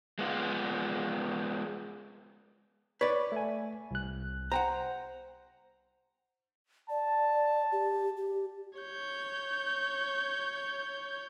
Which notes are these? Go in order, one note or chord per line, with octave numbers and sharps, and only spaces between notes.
G#3 B3 F4
B4 C#5 D5
A3 G#5
C2 F#6
C5 F#5 G5 A#5
D5 A5
G4
G4
C#5 G6